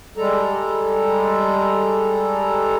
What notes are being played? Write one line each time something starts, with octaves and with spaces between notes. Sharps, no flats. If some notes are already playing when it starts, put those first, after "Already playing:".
G3 G#3 A4 A#5